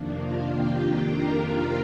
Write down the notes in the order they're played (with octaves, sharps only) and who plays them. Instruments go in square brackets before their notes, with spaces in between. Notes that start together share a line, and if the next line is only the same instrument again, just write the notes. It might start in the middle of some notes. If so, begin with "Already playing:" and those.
Already playing: [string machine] F2 C3 D#3 A#3 D4
F4 F5
G4 G5
A#4 A#5